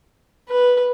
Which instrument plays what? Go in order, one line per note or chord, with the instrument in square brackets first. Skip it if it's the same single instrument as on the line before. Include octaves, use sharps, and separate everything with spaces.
[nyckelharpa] B4